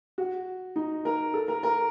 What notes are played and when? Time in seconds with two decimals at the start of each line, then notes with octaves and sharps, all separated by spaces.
0.18 F#4
0.76 D#4
1.05 A#4
1.34 A4
1.48 A#4
1.63 A#4